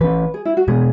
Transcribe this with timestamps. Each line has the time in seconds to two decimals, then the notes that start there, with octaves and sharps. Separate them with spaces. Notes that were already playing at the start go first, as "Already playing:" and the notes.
0.01 E3 C#4 B4
0.34 G#4
0.45 E4
0.57 F#4
0.68 B2 G#3 B3 G#4